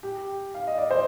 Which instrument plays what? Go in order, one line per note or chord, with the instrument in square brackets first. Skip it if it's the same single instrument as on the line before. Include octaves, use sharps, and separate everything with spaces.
[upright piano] G4
F5
D#5
D5
C5